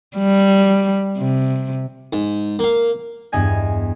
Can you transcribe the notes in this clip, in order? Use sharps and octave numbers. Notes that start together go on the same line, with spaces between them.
G3
C3
G#2
A#3 F5
E2 G2 B3 D#5 G#5 G#6